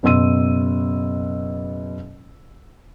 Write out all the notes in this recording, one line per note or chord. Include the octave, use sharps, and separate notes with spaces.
F#1 B2 C6 E6 D#7